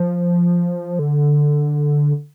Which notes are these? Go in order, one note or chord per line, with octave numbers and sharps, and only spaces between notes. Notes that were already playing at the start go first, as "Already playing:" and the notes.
Already playing: F3
D3